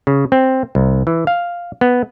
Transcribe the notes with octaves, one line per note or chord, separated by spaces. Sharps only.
C#3
C4
C2
E3
F5
B3